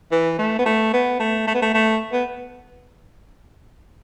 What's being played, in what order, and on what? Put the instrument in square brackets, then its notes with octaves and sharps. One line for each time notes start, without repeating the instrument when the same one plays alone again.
[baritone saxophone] E3
A3
B3
A3
B3
A3
A3
B3
A3
A3
B3